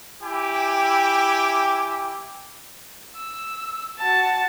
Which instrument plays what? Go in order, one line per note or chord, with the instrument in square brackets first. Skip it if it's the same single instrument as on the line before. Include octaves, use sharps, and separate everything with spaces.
[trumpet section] E4 G4 G5 G#5 D6
[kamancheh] E6
F#4 A5